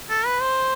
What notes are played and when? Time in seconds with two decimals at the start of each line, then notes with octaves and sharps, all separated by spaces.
0.10 A4
0.26 B4
0.41 C5